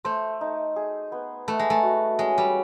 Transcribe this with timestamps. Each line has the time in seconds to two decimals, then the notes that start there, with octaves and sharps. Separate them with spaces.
0.05 A3 C5
0.41 D#4
0.76 G#4
1.12 B3
1.48 A3 B4
1.59 G#3
1.70 A3
1.83 F#4
2.19 G#3 C#4
2.38 G3